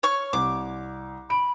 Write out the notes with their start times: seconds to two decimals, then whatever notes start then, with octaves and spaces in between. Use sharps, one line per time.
0.03 C#5 C#6 F6
0.33 C2 D6
1.30 B5 D7